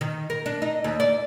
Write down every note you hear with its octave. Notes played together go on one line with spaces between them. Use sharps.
D#3
A#4
D4
D#4
D#2
D5